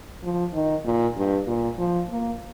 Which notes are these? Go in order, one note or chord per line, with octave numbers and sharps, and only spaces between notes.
F3
D#3
A#2
G2
A#2
F3
A#3